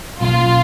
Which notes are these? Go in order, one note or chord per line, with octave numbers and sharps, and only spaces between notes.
B2 F#3 A#3 C#4 F4